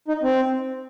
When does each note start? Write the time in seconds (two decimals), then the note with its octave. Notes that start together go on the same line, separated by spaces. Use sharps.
0.08 D#4
0.23 C4